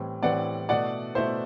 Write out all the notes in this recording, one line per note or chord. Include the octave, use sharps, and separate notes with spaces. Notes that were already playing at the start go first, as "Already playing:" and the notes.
Already playing: A2 E3 G3 C4
A2 E3 G3 C4 D5 F#5
B2 A3 E4 D5 F#5
B2 A3 E4 C5 E5